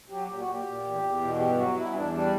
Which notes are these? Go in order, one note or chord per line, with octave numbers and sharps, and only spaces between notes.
F#3 G4
A#2 G4
F#4
A#2 G4
A#2
E2
E2
B2
G2 G4
F#3 F#4
G2 E4
C#4
E2 D4
G3 D4